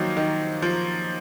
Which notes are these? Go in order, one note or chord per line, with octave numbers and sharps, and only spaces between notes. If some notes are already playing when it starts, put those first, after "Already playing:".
Already playing: D#3 F3 F#3 A#3
D#3
F3